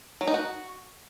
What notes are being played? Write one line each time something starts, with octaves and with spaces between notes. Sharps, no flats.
F#3
D#4
F#4